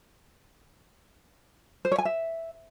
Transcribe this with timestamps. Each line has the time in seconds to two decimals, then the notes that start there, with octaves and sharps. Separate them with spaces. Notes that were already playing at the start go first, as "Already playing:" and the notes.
1.85 C5
1.92 C#5
1.98 G#5
2.05 E5